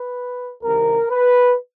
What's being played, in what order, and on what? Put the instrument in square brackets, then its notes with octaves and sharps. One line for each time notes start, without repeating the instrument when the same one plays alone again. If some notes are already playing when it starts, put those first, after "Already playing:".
Already playing: [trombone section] B4
C2 C3 D#3 A#4
B4